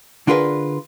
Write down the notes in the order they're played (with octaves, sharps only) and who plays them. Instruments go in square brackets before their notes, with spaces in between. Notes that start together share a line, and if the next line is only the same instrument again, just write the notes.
[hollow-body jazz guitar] D3 D4 F4 G#4 A#4 B4